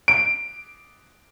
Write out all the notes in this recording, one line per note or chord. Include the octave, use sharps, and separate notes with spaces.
D7